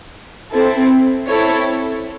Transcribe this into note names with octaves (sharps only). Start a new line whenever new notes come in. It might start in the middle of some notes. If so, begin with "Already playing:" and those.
C4 E4 A4
C4 E4 A4 C#5